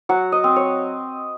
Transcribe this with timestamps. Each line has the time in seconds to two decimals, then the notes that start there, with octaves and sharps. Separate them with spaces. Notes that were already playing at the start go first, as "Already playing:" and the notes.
0.09 F#3 F#5
0.32 D#5
0.44 C4
0.56 C#5